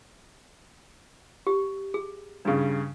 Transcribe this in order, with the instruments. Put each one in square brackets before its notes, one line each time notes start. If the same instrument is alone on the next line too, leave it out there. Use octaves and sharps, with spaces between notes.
[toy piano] G4
G#4
[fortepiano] G2 C#3